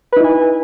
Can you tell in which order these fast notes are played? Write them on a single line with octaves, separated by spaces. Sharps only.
B4 D#4 E4 G#5